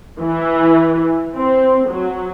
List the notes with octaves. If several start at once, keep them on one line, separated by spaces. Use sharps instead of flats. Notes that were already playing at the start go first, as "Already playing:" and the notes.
E3
C4
F#3